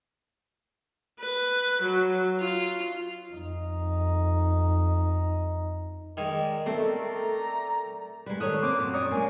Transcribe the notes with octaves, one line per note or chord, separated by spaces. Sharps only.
B4
F#3
F4
F2 D#4
D#3 G#3 A#4 D5
A3 C4
A#5
G3 G#3 B4
D#3 A4 C#5 D#6 F#6
A#3 C4 C5 D6
F#2 A#2
A#4 C#5 D5 D#6
G#3 A#3 G#5